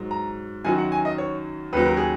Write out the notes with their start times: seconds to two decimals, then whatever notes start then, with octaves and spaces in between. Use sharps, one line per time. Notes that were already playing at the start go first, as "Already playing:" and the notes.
Already playing: G#2 F#3
0.11 A#5
0.65 F#2 D#3 F#3 G#5
0.78 F#5
0.92 G#5
1.05 D#5
1.18 C#5
1.73 D#2 C#3 F#3 B4
1.85 A#4
1.97 G#4